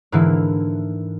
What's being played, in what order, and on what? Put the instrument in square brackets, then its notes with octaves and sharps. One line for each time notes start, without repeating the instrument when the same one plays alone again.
[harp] G#2 D3 E3 A#3 E4